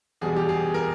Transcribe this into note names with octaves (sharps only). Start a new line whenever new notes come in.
E2 B2 G3 G#4
G4
G#4
A#4